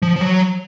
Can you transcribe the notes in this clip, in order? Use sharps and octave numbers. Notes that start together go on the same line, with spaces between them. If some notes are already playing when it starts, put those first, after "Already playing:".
F3
F3
F#3